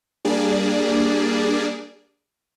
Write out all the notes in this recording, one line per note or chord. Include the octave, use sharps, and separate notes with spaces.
G3 A#3 D4 G#4 D5